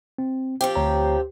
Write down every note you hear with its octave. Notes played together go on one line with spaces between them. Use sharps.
C4
F3 C4 G4 G5
D2 C#5 A#5